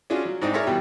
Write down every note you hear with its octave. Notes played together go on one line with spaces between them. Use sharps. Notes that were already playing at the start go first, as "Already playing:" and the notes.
C#4 D4 F4 F#4 G#4
F#3
G#2 C4 D4 D#4
G#4 A#4 C#5 D5 E5 A#5
B2 E3 G3 G4 G5